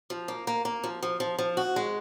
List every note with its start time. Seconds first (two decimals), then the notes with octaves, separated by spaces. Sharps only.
0.10 F3
0.28 A#3
0.47 A#3
0.65 A#3
0.84 F3
1.03 F3
1.20 F3
1.39 F3
1.57 F#4
1.76 G#3